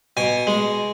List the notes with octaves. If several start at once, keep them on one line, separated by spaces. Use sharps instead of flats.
B2 G#5
G#3